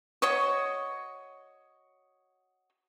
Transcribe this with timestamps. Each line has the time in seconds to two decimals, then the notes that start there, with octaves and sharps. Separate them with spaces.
0.22 F#4 C#5 D#5 C#6